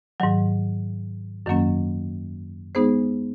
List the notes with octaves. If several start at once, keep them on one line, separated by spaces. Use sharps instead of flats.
G#2 D#3 F#3
F#2 D#3 F#3 A#3 C#4
G#3 B3 D#4 G#4 C5